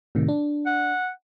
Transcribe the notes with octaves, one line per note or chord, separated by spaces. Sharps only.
A2 C3 D#3
D4
F#5